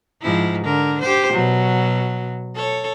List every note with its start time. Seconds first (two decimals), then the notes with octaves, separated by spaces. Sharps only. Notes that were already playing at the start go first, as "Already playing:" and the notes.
0.22 G#2 F3 E4
0.64 D3 A#4
1.01 G4 C5
1.33 B2 F#3
2.55 A4 C#5